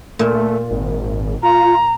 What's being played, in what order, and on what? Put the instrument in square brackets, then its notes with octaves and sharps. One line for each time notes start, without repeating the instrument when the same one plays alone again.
[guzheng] A#2 [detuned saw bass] A3
[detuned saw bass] G#1
[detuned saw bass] F4 [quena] A#5